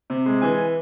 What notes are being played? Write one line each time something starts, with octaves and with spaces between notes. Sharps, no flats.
C3
G#3
E3 G#5